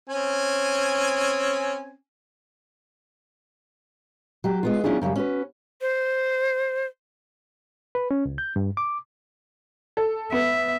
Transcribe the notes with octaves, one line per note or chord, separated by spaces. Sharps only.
C4 C#4 G#5
F#3 G4
G#3 B3 F4
F#3 C#4 D4 E4 F4 G#4
F#2 C#3 E3 F#3 G3
C#4 F#4 B4
C5
B4
C#4
C#2
G6
G2
D6
A4
B3 E5